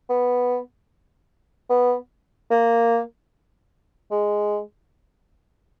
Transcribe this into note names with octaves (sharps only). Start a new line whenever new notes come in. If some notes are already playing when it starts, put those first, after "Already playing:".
B3
B3
A#3
G#3